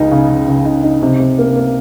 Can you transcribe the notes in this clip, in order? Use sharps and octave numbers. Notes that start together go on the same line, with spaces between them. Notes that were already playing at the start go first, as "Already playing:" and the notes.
Already playing: C#2 C#3 D#4
C#3
C#3
C#3
D#4
D#4
C3
C3
A#3
A#3